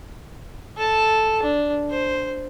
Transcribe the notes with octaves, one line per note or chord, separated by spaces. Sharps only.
A4 A5
D4
C5